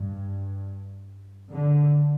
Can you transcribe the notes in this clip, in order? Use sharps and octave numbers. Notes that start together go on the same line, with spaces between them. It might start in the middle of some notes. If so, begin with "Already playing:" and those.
Already playing: G2
D3